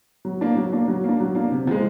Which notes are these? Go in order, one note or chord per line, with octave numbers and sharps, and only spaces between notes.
F#3
A#3 D4
F#3
A#3 D4
F#3
A#3 D4
F#3
A#3 D4
C3
F3 G#3